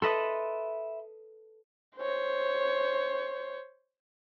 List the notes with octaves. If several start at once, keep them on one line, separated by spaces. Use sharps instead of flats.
A4 B4 D#5 E5 B5 C6
C5 C#5